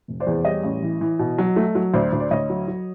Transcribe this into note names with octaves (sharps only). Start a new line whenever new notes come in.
F1
C5 D5
E2
G3 C#5 D#5
A1
E3
E3
B2
F#3
A3
F#3
D2 C5 D5
D2
D5
D2 C#5 D#5
F#3
F#3